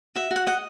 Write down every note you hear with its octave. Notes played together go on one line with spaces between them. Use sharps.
F#4 E5
F#4
F#5
D#5 F#5